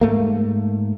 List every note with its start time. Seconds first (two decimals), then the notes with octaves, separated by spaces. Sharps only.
0.01 G#2 A3 A#3